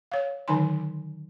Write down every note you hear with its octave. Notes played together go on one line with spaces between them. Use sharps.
C#5 F5
D3 D#3 F#3 D#4 G#5 C6